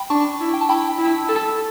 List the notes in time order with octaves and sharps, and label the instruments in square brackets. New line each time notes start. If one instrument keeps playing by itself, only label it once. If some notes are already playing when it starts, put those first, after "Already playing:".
Already playing: [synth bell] G5 B5
[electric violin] D4 [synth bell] A5 C#6
[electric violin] E4
[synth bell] G5
A5
[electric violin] E4 [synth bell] G5 B5
[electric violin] E4
A4